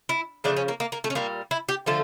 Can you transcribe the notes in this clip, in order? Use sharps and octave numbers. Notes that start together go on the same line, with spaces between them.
E4
C#3 F3 A3 D4
C#4
A#3
A#3
A#3
A3
C#4
A#2 G3 A#3
E4
G4
D3 F3 A3 A4